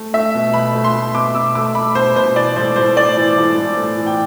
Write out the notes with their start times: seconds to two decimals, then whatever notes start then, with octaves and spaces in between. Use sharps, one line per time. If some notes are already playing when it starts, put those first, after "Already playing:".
Already playing: A3
0.14 A3 E5
0.34 B2
0.54 B2 B5
0.75 A3
0.84 C6
0.94 A3
1.14 B2 D6
1.35 B2 E6
1.55 A3 D6
1.75 A3 B5
1.95 B2 C5
2.15 B2 C5
2.36 E3 D5
2.56 A2 C5
2.76 A2 C5
2.96 A3 D5
3.17 E3
3.38 A2
3.58 A2
3.77 A3
3.97 E3
4.06 G5